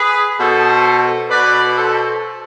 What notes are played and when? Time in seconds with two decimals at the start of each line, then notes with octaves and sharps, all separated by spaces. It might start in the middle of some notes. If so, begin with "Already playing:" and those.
Already playing: G#4 B4
0.38 B2 A4 C5
1.30 B2 B4 D5
1.76 A4 C5